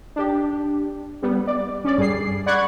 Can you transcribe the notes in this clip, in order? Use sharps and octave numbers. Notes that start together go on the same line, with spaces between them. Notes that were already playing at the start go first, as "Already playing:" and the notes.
D4 G4
G3 B3
D5
C#4 D5
G2 G#4 C7
D5 F#5 B5 C#6 F#6 G#6